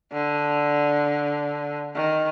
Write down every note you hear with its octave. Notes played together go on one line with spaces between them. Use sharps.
D3
D#3